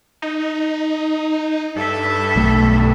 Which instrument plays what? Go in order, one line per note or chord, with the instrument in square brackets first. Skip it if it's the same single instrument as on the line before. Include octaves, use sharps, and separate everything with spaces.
[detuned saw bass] D#4
[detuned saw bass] G2 [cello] A4 E5
[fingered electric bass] B1 A3